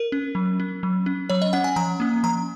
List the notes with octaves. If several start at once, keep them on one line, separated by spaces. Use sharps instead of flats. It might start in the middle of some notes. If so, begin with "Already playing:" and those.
Already playing: A#4
C#4
F#3
C#4
F#3
C#4
F#3 C#5
D#5
C#4 F#5
G#5
F3 A#5
A#3 C#4
F3 A#5